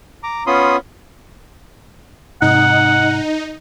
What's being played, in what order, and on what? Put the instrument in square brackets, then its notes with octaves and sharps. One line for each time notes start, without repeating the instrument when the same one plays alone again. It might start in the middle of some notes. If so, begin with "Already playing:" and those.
[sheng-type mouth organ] A#5 D6
B3 C#4 F4 B5 C6 D#6
[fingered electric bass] G#2 C3 [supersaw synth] D#4 [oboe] F#5